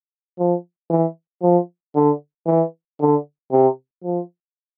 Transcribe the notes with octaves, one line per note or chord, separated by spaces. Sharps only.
F3
E3
F3
D3
E3
D3
C3
F3